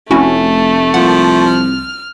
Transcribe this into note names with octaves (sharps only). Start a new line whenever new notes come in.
F1 A3 C#4 E4 F#4
C2 F3 A#3 F#5
F6